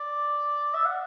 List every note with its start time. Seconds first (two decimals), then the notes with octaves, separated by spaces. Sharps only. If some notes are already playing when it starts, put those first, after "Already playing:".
Already playing: D5
0.74 E5
0.85 F#5